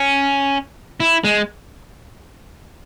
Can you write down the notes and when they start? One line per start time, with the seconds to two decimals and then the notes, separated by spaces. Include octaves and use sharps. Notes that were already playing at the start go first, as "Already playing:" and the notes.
Already playing: C#4
1.00 E4
1.24 G#3